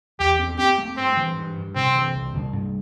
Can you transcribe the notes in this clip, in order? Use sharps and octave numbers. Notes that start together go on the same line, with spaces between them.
E2 G4
C4
C4 G4
A3
G2 C4
E3
G2
G2
C3 C4
E3
C2
C2
G2